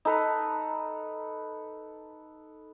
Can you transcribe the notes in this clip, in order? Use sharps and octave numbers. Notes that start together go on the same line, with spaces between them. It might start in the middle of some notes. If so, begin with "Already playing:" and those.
D#4 A4 B4 A#5